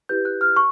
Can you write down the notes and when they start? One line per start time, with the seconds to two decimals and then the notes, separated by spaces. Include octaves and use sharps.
0.09 E4 G4 B4 G6
0.25 F#6
0.41 F6
0.57 C#6